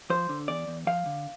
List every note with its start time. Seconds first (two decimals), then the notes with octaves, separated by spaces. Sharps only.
0.10 F3 C5
0.29 D3
0.48 E2 D5
0.68 E2
0.87 F3 F5
1.06 D3